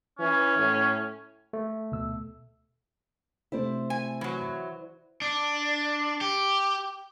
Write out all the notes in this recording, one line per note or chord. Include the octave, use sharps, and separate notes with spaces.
E3 C#4
A2
A3
D2 B2 E6
C3 A3 E4 C5 D5
G#5
E3 F#3
D4
G4